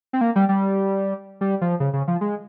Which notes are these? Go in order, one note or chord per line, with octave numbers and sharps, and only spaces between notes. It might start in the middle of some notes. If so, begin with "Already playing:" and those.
C4
A#3
G3
G3
G3
F3
C#3
C#3
F3
G#3